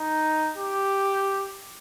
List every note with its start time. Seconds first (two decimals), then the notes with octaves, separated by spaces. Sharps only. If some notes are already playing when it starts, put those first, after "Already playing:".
Already playing: D#4
0.57 G4